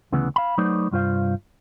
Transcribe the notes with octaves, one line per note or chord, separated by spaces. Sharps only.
D2 C#3 E3 B3
F5 B5
F#3 A3 D#4 B4 C5 D5
C2 G2 F4 C5 F5